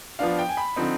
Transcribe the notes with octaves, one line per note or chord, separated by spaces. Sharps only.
F3 B3 D4 F5
G5
G#5
B5
D3 F3 C4 D#4